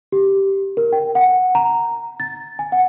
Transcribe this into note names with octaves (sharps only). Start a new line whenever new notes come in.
G4
A#4
G5
F#5
A#5
A6
G#5
F#5